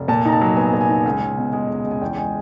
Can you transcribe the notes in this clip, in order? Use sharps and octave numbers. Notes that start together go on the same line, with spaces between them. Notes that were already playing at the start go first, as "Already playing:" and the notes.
Already playing: F1
A#2 A5
D#4 A#5
A5
F#3
B3 G#5
A#2
G#5
D#4
C#2
C#2
B2
G#3
C#2
C#2
G#5
E2 G5
G#3 G#5